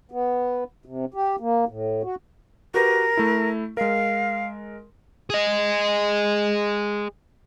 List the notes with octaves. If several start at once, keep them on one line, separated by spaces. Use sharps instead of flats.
B3
C3
G4
A#3
A2
F#4
F#4 G4 A#4 B4
A3 E4
G#3 A#4 F5
G#4 D#5